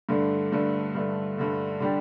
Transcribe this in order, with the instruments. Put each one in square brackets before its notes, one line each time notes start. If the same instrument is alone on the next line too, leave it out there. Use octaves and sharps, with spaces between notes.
[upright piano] G2 D3 A3
G2 D3 A3
G2 D3 A3
G2 D3 A3
D3 G3 D4 G4